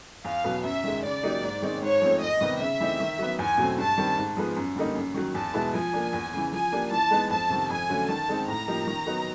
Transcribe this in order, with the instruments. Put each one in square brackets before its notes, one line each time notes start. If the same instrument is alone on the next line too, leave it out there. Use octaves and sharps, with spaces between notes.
[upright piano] E2 [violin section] F5
[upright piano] B2 F#3 B3
[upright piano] F#2 [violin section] E5
[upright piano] D#3 G#3
[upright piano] C#3 [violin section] D5
[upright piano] F#3 A#3 D#4 G4
G#2
D#3 G#3 C4 D#4
[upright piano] G#2 [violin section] C#5
[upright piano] F3 A3 C4
[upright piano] E2 [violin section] D#5
[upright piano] C3 D#3 G3 B3
[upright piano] C#3 [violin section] E5
[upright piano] E3 A3 C4 D#4
D#3
F#3 B3
[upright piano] E2 [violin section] G#5
[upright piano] B2 F#3 A3 C4
[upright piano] G2 [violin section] A5
[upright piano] D#3 G3 C4
G#2
F3 G#3 B3
F#2
D3 G3 A#3 D#4
F#2
D#3 F#3
[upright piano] E2 [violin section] A5
[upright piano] B2 G#3 B3 E4
[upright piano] F3 [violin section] G#5
[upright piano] A#3 D4
E2
C#3 E3
[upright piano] F3 [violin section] G#5
[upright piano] A#3 D4 G4
[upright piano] E3 [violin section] A5
[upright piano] G#3 B3 D#4
[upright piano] F2 [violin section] A5
[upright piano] C3 D#3
[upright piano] F2 [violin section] G#5
[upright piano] D3 F#3 A3 C#4
[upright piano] D#3 [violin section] A5
[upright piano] G#3 C4 D#4
[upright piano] A2 [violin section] A#5
[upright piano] F3 A#3 D#4 G4
D#3
F#3 B3 D#4